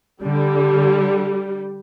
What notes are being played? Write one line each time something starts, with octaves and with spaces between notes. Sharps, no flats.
D3 G3